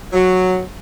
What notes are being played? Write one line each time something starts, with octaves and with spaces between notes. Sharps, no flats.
F#3